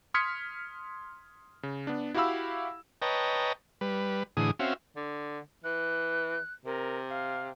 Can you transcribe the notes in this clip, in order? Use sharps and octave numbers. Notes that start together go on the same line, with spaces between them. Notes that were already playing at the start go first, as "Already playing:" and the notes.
C6 D#6 F6 G#6 B6 C#7
C#3
B3 D4
E4 F#4 G4 F5 B5 E6
B4 C#5 D#5 G5 A5 A#5
G3 B4
A2 D3 E3 G#4 D#6
C4 C#4 F#4 E5 F5
D3
E3 F#6
C3 A#4
F5